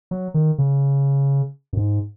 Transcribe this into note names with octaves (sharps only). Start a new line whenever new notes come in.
F#3
D#3
C#3
F#2
G#2